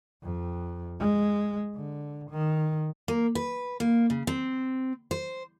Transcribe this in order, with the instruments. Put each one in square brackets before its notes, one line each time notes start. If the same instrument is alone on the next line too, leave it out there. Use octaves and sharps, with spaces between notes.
[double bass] F2
G#3
D3
D#3
[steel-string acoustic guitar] A#3
B4
A#3
C#3
C4
C5